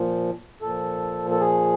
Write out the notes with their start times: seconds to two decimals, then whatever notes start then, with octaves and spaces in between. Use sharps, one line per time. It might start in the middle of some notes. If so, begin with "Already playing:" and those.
Already playing: A#2 F3
0.62 A#2 F3 A4
1.31 A4
1.40 G#4